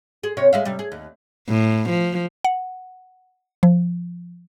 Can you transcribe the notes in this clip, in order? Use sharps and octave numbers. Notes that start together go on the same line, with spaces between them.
G#4
C3 A#4 C#5
G#3 E5 F5
C3 G3
G#4
D#2
A2
F3
F#5
F3